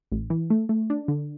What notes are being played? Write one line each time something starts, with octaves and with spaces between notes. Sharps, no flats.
A1
E3
A3
A3
D4
D3